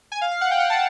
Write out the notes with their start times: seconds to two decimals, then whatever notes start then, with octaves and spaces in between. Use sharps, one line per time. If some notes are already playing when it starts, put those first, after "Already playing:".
0.12 G#5
0.21 F5
0.31 F5
0.41 F#5
0.51 G5
0.60 F#5
0.70 A5